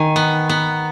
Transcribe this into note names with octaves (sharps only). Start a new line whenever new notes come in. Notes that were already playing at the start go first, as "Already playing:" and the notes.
Already playing: D#3 G#5
B3
B3